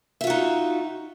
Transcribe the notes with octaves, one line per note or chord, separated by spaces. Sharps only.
D#4 F4 F#4 E5